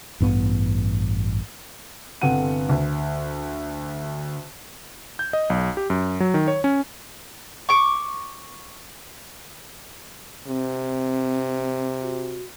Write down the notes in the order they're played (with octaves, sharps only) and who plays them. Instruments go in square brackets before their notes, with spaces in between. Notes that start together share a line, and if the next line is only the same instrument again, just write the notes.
[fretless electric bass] A1 G2 B3
[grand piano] G1 C3 A4 F#5 D#7
D2
[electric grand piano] G6
D#5
B1
G4
F#2
F#3
D#3
C#5
C#4
[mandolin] C#6 D6
[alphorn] C3 [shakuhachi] C4
[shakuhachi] F#4